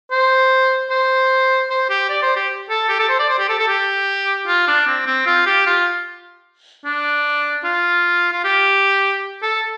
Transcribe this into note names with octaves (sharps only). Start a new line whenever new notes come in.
C5
C5
C5
G4
D5
C5
G4
A4
G4
A4
C5
D5
C5
G4
A4
A4
G4
F4
D4
C4
C4
F4
G4
F4
D4
F4
F4
G4
A4